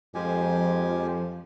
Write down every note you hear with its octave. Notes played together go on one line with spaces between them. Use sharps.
F2 F3 G#3 G4 G#5